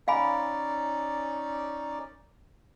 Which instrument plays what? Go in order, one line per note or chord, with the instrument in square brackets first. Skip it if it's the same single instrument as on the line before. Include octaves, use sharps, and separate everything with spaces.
[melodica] C#4 D#4 D5 [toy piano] F5 G#5 B5